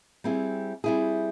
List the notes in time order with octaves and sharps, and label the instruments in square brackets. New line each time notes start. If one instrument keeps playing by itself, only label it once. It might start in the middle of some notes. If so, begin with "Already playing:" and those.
[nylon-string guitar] G3 C4 E4 G#4
G3 C4 E4 G#4